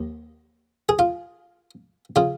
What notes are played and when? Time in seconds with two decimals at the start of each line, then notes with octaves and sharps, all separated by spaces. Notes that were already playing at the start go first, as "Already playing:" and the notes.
Already playing: D#2
0.89 G#4
0.99 F4
2.16 C#3 F4